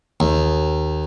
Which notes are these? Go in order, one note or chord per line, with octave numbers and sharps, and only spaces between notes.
D#2